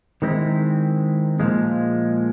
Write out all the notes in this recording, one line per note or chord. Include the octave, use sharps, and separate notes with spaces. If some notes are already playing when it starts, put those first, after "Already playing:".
D#3 G#3 C4 E4
A#2 F3 G#3